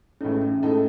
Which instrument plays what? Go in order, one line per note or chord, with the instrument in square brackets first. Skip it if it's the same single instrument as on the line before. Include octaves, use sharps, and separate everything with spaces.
[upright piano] A1 A2 G#3 D#4 A4 [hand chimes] C#4
[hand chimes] C#4
[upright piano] A2 G#3 D#4 A4